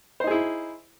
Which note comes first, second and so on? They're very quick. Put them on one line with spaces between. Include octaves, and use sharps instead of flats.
C5 D#4 G#4 E4